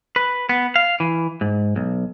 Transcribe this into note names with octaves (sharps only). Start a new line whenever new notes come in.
B4
B3
F5
E3
G#2
B1